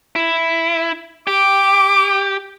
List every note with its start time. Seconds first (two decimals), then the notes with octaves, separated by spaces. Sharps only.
0.16 E4
1.27 G4 D6